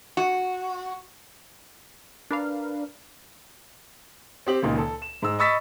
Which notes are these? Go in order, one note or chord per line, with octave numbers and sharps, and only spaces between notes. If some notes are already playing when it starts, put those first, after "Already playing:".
F#4
D4 A#4 B4 D5 F5
C4 G4 F#7
C#2 A#2 D#3
A4
E7
G#2 E6
D#5 B5 C#6 E6 A6 B6